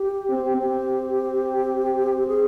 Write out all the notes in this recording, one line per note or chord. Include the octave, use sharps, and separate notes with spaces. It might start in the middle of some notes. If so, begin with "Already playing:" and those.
Already playing: G4
C4
C4 G4
G#4